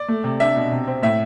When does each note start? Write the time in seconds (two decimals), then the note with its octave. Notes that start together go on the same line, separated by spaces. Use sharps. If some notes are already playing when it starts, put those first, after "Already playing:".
Already playing: D5
0.08 A3
0.24 C3
0.40 D4 E5
0.56 B2
0.72 C3
0.87 C4
1.03 A2 E5